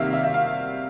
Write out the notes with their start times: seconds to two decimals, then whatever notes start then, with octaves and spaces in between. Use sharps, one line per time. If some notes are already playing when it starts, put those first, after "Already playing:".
Already playing: C3 D#3 G3 A#3 E5 F5
0.13 E5
0.24 E5
0.34 F5